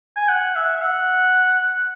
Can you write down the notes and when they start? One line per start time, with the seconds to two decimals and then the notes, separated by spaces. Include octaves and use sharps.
0.17 G#5
0.29 F#5
0.56 E5
0.76 E5
0.82 F#5